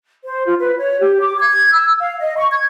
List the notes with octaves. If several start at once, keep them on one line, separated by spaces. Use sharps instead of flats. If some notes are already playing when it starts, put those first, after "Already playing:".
C5
F4
B4
C#5
G4
D6
G#6
E6
F5
D#5
C#6
G#6